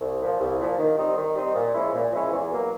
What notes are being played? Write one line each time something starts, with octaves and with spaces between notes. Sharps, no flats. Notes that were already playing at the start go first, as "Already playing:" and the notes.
C2
A#2 F3
C2
A#2 F3
D#3
G3 C4 D#4
D#3
G3 C4 D#4
A#2
F3 G#3 C#4 E4
A#2
F3 G#3 C#4 E4
E2
B2 F#3 A#3